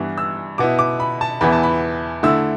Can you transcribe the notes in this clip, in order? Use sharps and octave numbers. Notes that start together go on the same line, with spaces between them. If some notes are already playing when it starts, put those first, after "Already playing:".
Already playing: G2 E3 B3 E4
E6
B2 B3 E4 D6
D6
B5
A5
E2 E3 B3 E4 B5
A5
B5
D3 A3 E4 E6